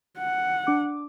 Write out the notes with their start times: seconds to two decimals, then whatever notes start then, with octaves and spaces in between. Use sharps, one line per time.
0.18 F#5
0.67 D4 D6